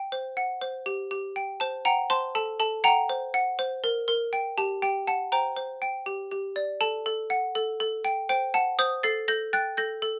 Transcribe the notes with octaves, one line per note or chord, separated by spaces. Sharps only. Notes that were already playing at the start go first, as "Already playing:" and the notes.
Already playing: G5
C5
F#5
C5
G4
G4
G5
C5 A5
F#5 G5 A#5
C5 A5 C6
A4 A5
A4 A5
F#5 G5 A#5
C5
F#5
C5
A#4
A#4
G5
G4 A5
G4 G5
F#5 A5
C5 G5 A#5
C5
G5
G4
G4
D5
A4 A5
A4
F#5
A4
A4
G5
C5 G5
F#5 A5
C5 D#6 G6
A4 A6 C7
A4 G6 A#6
G5 F#6 A6
A4 G6 A#6
A4